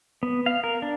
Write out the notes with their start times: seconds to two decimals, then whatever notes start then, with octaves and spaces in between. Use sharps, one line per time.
0.23 B3
0.46 F5
0.64 A#4
0.82 D4